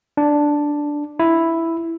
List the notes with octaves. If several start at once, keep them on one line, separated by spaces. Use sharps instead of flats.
D4
E4